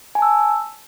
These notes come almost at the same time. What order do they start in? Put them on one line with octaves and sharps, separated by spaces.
G#5 A5 E6